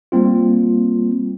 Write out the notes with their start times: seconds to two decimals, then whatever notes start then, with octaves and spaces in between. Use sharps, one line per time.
0.12 G3 A#3 C4 F4